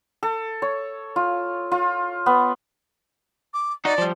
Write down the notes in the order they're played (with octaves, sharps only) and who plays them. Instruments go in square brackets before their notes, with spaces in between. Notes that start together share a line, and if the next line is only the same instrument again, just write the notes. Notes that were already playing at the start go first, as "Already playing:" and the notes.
[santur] A4
C#5
F4
F4
B3
[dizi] D6
[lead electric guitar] D#4 F#4 [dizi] D5
[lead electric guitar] F3 G3